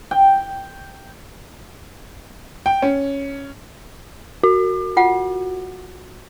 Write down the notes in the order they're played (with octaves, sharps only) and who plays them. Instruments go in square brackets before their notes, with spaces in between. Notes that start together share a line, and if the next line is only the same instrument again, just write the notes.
[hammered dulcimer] G5
[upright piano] G5
C#4
[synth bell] F#4
[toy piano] F4 F#5